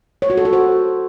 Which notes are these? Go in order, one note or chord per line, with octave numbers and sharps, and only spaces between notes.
C#5
F#4
A4
F#4
C5